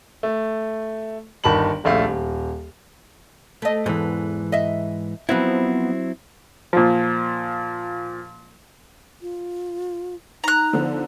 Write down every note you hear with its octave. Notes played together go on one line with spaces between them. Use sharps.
A3
G1 D#3 A5 B5 F#7
D#1 A#1 A3 F5
D#1
A3 D#5
E2 G#2 E3
D#5 E5
F3 F#3 B3 C4 E4
A#2 F3
F4
D#4 A#5 F#6
D3 F3 B3